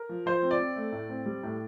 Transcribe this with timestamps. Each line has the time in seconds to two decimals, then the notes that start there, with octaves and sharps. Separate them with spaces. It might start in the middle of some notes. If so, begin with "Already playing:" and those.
Already playing: A#4
0.09 F3
0.26 F3 C5
0.43 C4
0.51 D5
0.60 C4
0.76 A3
0.92 A2
1.09 C4
1.26 G3
1.43 A2